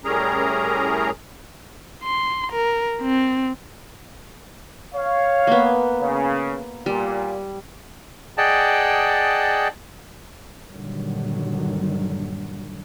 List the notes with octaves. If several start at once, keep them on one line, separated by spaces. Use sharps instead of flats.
A2 G3 C#4 G#4 A#4 A#5
C6
A#4
C4
C#5 F5
A#3 B3
C#3
A#2 G3
G#4 D5 D#5 F#5 G5 A5
G2 A#2 D3 D#3 F#3 G3